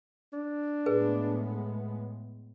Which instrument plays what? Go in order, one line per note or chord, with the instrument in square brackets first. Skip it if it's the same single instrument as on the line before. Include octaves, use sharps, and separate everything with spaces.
[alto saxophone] D4
[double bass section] A2 G#3 B3 [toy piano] G#4 B4